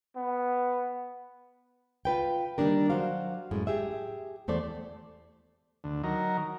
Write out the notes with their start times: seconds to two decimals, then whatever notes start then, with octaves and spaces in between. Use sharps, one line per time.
0.16 B3
2.05 F4 B4 G5
2.58 D#3 G3 A#3 D4 A#4
2.90 F#3 F#4 C5 F5
3.51 F#2 A2 G#3
3.67 G4 G#4 E5
4.48 E2 A3 C5 D5
5.84 D2
6.04 D#3 F#3 A#4